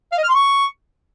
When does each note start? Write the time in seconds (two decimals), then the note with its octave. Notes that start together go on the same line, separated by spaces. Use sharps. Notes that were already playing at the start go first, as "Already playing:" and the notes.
0.12 F5
0.18 D#5
0.23 F6
0.29 C6
0.35 C#6